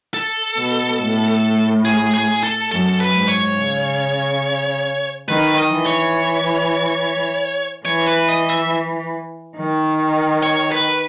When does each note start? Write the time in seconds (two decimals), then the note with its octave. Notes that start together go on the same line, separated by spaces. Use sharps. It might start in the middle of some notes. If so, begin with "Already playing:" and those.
0.14 A4
0.57 B2
1.00 A2
1.85 G#4
2.14 G#4
2.43 A4
2.71 F#2 A4
3.00 B4
3.14 G#2
3.29 C#5
3.57 C#3
5.28 D#3 B4
5.57 D#5
5.71 E3
5.86 C#5
7.85 E3 C#5
8.07 B4
8.29 D#5
8.50 E5
9.57 D#3
10.43 C#5
10.72 B4